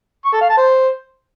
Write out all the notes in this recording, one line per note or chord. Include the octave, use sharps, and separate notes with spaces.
C#6
A4
F5
A5
C5